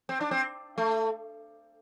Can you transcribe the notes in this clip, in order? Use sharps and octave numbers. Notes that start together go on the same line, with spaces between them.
C4
D4
C4
A3